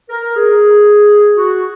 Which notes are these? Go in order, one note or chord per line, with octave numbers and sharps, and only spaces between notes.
A#4
G#4
F#4